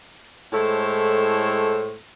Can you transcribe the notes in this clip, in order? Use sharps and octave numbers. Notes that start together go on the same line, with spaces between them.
A2 G#3 E4 A4 C5 C#5